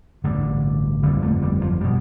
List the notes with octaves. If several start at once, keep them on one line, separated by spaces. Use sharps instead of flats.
A1 G2 D3
G1 F2 D3 G3
A3
G3
F3
G3
B2